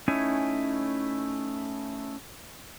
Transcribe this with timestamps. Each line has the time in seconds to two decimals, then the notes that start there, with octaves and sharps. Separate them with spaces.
0.08 A3 C#4 D#4 E4 C#5 G#5